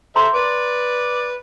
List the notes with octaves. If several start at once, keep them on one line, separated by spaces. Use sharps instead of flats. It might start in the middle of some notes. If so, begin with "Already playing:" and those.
A4 C5 E5 A#5 C6
B4 D5 D6